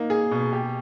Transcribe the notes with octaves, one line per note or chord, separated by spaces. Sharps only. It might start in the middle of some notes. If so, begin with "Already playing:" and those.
Already playing: A#3 D#4
G#4
B2
G4